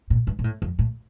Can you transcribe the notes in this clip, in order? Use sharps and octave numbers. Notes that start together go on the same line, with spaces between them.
A#2
G2
A#2
A2
F2
A2